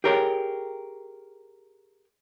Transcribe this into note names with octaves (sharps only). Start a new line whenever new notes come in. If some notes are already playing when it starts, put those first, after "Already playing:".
G4 G#4 A#4 C#5 G5